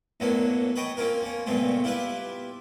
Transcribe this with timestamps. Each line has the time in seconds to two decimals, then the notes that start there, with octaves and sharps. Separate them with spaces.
0.20 F#2 A2 F#3 A#3 B3 D4
0.76 B4 C#5 D#5 G5 A5
0.97 A#3 C4 C#4 F4 A#4
1.22 A#3 C#4
1.46 C#2 G2 A#2 A3 B3 C4
1.84 E4 F4 G4 B4 E5